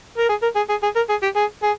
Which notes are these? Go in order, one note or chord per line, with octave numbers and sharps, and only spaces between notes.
A#4
G#4
A#4
G#4
G#4
G#4
A#4
G#4
G4
G#4
G#4